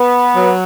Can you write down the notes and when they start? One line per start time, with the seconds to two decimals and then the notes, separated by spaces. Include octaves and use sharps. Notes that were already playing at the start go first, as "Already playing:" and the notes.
Already playing: B3
0.36 F#3